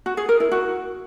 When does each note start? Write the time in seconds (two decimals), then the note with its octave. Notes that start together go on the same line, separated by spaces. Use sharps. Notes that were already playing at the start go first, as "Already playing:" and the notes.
0.06 F#4
0.17 G#4
0.29 A#4
0.40 E4
0.52 F#4